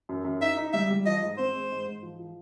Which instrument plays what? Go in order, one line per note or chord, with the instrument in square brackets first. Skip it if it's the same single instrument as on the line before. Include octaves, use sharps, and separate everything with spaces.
[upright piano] F#2
F#2
[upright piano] D#4 [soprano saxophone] E5
[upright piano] D#4
[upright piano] G3 [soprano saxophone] E5
[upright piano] G3
[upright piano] F3 [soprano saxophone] D#5
[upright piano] G#2
[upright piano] C4 [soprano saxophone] C5
[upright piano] G#3
G#2
G#2
F3
F3